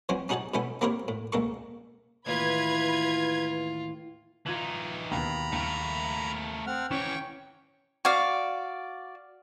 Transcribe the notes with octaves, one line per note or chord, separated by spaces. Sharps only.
E3 F#3 C4 C#4
C#4 D#4 F#4 G#4 C#5 A5
B2 E3 B3 C#4 A4
A#3 C4 E4 G4 A#4 C#5
A2
C#2 A#3 A4 C#6
D#2 A2 E3 F4 B4 G#6
E3 D#4 F4 G#6 F#7
D#2 B2 A#5 B5
D#2 A3 A#4
C4 F#5 F6
E3 C#4 C#5 G5 C#6
F#4 D5 F5